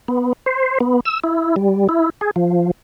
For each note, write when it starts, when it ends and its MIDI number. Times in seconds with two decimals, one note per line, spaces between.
0.08 0.33 59
0.46 0.78 72
0.80 1.00 59
1.05 1.20 88
1.24 1.55 64
1.56 1.87 55
1.89 2.10 64
2.21 2.31 68
2.36 2.71 53